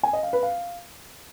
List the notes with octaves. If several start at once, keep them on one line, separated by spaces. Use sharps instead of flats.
G#5
D#5
F5
B4
F5